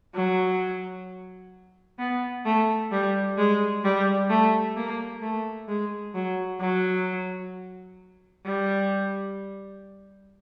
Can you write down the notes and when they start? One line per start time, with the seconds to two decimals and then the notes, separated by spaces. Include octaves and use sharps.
0.15 F#3
1.99 B3
2.45 A3
2.92 G3
3.38 G#3
3.84 G3
4.30 A3
4.76 A#3
5.22 A3
5.68 G#3
6.15 F#3
6.60 F#3
8.46 G3